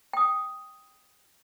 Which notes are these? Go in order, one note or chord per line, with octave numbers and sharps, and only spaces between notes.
G5 D#6